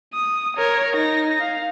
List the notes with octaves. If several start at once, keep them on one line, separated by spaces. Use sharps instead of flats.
D#6
A#4 C#5
D#4 A#6
F5